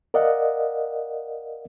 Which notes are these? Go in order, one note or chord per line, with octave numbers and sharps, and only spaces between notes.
A#4 D5 D#5 F5 F#5